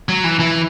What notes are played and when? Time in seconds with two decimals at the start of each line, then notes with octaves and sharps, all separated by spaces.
0.09 F#3
0.24 E3
0.40 E3